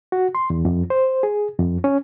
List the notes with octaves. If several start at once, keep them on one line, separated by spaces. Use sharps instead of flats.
F#4
C6
E2
F2
C5
G#4
F2
C#4